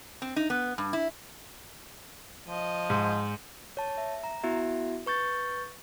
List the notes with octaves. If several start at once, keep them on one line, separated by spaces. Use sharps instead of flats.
C4
D#4
B3
G2
E4
F3 D#5
G#2
C#5 A5
E5
A#5
B3 E4 F#4 E5
B4 C#6 G6 A6